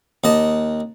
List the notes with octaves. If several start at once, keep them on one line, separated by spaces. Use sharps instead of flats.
D#2 D#5 A5